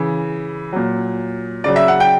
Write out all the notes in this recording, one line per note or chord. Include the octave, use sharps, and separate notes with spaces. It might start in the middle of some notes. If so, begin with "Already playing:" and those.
Already playing: C#3 E3
A#2 F#3
C#3 F#3 D5
E5
F#5
G5